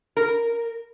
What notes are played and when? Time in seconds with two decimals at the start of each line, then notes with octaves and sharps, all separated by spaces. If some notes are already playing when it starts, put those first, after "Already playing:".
0.17 A#4